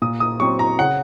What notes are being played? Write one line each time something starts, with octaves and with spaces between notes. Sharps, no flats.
A#2 D#6
D#6
F#3 C4 C#6
A#5
C#3 F#5